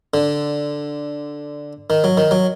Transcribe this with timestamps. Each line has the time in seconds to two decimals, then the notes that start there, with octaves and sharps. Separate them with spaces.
0.14 D3
1.90 D#3
2.04 F#3
2.17 D#3
2.31 F#3